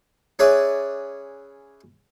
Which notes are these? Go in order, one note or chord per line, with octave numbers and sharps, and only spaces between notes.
C#4 G#4 B4 C#5 D5 E5